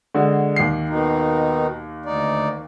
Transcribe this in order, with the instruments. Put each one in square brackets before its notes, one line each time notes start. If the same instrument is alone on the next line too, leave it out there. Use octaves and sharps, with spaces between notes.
[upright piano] D3 G#3 F#4
D#2 C7
[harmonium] B2 D#3 D#4
D2 D#4 D5